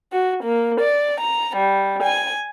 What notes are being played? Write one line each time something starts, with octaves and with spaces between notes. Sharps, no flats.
F#4
A#3
D5
A#5
G3
G#5